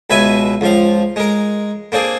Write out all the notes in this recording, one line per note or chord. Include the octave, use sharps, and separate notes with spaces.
C#2 B2 B4 E5 G#5
C#2 F3 F5
G#3 A#4
A#3 C4 D4 G#4